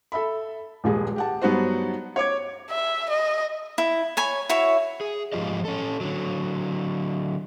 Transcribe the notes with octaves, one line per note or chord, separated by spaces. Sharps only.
A4 E5 B5
D#1 A#1 G2 G3 G#3 G#4
G4 F#5 A5
G2 F#3 B3 D#4 F#4 C5
C#5 C#6 D6 G#6
E5
D#5
E4
C#5 G#5 B5
E4 F#4 C#5 E5
G#4
G#2 E3 F3 F4 G4 D#5
C#4 A4
D3 F#3